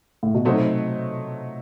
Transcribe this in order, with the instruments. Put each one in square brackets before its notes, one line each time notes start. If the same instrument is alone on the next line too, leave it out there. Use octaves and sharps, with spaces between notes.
[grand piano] A2
B2
[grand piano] C3 [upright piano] F#3 A3 D#4 F#4 C5